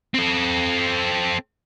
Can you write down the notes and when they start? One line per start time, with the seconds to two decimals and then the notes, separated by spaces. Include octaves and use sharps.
0.14 C4 A4